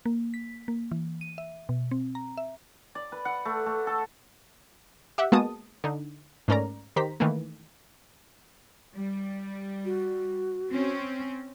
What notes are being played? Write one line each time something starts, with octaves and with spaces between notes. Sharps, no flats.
A#3
B6
A#3
E3
D#7
E5
B2
C4
A#5
E5
D5
B4
F#5
A3
A3
A4
G4 E5 F#5
G#3 A#3 B3 F#4 A5 D#6
D3 D#4
G#2 A3 C#4 A#4 D5 A#5
D#3 G4 C5 A#5 B6
D#3 E3 A3 A#3
G3
F#4
C4 C#4